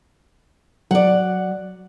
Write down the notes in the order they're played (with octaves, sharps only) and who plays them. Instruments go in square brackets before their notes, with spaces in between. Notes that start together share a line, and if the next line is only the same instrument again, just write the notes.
[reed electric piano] F#3 [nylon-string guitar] D5 F#5